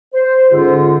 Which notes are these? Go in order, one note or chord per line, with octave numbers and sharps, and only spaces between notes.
C5
G#2 D3 C#4 F4